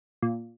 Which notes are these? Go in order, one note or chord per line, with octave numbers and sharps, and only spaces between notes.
A#2